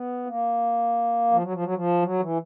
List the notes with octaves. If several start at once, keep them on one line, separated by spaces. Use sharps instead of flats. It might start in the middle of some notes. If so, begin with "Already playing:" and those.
Already playing: B3
A#3
F3
F#3
F3
F#3
F3
F#3
E3